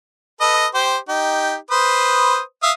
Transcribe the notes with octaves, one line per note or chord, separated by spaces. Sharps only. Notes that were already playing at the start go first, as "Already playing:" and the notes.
A4 B4 D#5
G4 C5
D#4 G4
B4 C5 D#6
E5 F5 D#6